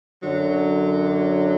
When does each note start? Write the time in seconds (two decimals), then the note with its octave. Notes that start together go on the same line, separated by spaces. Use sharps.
0.22 F#2 D3 F#3